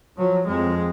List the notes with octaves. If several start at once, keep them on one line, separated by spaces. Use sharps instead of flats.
F3 F#3
F2 G#3